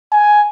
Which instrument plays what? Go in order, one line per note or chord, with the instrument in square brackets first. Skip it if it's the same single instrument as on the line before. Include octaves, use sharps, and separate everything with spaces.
[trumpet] G#5